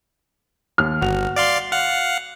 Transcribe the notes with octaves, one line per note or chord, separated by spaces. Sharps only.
D#2 F6
G1 F#4 F7
D5 F5 C6
F5 F#5